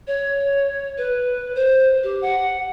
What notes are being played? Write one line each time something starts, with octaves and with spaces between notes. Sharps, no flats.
C#5
B4
C5
G4
F#5